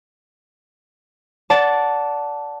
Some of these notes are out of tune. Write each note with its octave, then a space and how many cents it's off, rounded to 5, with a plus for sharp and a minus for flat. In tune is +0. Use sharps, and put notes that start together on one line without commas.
D5 -20 F#5 -5 A5 +0